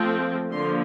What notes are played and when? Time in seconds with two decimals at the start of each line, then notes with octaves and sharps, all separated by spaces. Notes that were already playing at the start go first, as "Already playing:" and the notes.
Already playing: F3 A3 C4
0.51 D3 F3 A#3 C6